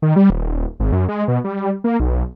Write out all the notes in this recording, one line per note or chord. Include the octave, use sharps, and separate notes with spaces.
D#3
G3
D#1
G#1
F#2
G#3
B2
G3
A#3
B1